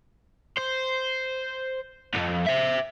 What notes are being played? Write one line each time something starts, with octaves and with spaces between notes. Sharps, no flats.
C5
C2 F2
C5 E5